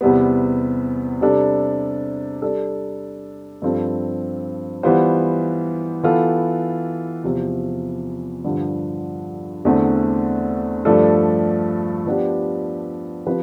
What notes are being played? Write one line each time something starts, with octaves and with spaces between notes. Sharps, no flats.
E2 C3 G3 B3
C3 G3 D4 A4
G3 D4 A4
G2 F3 C4 F4 A4
E3 G3 B3 F4 C5
E3 B3 F4 A4
E2 C3 F3
G2 D3 F3
E2 D3 A3 C4
G2 F3 A3 D4 A4
F3 B3 D4 G4
F3 C4 G4 B4